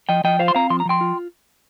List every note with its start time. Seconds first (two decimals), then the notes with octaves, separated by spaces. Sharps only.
0.09 F3 D#5 G5
0.24 F3 D#5 G5
0.39 F4 C5 F5
0.48 C6
0.55 C4 F5 A#5
0.70 F3 C6
0.80 A#5
0.85 F3 G5 C6
1.01 F4